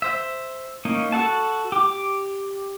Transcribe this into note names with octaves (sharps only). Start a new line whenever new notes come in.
C5 E5
A#3 C#4 D#4
F#4 A4 F#5 A5
G4 D6